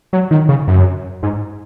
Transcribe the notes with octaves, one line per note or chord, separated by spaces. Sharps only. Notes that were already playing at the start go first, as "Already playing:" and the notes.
F#3
D#3
C#3
F#2
G#2